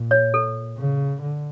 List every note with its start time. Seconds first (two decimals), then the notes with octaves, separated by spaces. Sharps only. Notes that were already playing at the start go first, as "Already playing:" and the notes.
Already playing: A#2
0.11 C#5
0.34 A4
0.78 C#3
1.22 D3